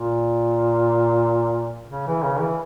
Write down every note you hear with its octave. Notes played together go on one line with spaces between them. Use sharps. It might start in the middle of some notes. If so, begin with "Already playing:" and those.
Already playing: A#2
C#3
E3
C#3
E3